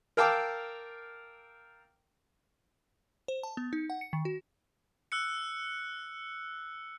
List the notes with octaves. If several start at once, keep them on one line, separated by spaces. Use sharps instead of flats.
A#4 F5 G5 A5 D6 E6
C5
A5
B3
D#4
F#5
C#7
D#3
F#4
E6 F#6 C#7